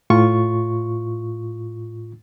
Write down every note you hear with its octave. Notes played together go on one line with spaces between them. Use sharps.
A2 F4 C#6